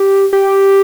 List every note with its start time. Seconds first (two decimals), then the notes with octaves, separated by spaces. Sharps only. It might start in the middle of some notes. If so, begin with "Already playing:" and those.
Already playing: G4
0.33 G4